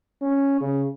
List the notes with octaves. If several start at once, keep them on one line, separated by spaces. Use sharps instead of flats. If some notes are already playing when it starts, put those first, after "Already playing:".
C#4
C#3